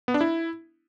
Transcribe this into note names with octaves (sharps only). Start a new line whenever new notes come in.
B3
D4
E4